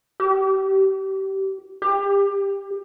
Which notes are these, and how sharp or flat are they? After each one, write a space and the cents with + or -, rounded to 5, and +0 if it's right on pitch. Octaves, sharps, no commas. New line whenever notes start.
G4 -25
G4 +30